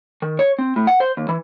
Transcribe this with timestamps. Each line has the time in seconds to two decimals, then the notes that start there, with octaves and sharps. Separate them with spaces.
0.22 D#3
0.39 C#5
0.59 C4
0.76 A2
0.87 F#5
1.00 C5
1.17 D#2
1.29 E3